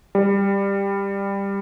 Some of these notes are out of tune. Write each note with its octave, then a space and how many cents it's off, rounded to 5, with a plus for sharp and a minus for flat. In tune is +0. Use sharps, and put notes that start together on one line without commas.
G3 +15